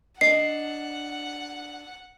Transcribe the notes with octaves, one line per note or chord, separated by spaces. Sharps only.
D4 D5 D#5 F#5 C7